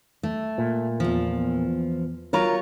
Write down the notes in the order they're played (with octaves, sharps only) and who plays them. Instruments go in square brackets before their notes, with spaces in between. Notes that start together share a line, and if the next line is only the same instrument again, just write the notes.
[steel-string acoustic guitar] A3
[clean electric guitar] A#2
[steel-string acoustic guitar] E2 F3
[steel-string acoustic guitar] F#3 F4 C#5 [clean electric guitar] A#4